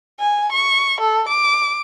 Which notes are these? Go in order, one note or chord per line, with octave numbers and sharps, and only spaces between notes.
G#5
C#6
A4
D6